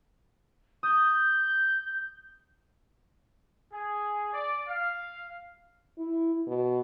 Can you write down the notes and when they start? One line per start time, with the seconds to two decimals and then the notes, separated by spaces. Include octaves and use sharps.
0.83 D#6 G6
3.73 G#4
4.32 D5
4.67 F5
5.98 E4
6.47 B2